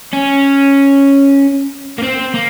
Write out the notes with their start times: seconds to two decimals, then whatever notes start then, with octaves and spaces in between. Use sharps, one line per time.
0.13 C#4
1.98 A#3
2.03 C4
2.34 A#3